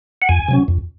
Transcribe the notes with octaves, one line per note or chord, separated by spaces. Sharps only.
F#5
F2 G#5
C3 F#3 C#4
F2